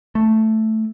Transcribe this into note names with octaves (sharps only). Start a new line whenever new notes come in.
A3